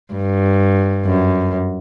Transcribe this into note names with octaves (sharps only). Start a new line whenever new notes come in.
G2
F#2